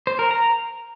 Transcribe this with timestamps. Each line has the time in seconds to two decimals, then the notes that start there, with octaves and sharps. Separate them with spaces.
0.07 C5
0.19 A#4
0.31 A#5